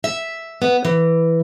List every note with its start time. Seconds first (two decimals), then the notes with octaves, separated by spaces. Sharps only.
0.04 E5
0.62 B3
0.85 E3